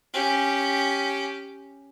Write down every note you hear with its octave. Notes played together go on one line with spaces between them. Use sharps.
C#4 G4